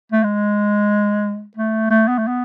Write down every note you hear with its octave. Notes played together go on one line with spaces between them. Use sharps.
A3
G#3
A3
A3
B3
A3
B3